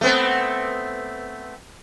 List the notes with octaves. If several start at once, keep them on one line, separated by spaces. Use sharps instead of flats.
A3 B3 C4